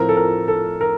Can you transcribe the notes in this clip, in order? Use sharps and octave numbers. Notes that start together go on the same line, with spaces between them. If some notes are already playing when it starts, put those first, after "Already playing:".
Already playing: A2 F3 A3 C4 A#4
A4
A#4
A4
A#4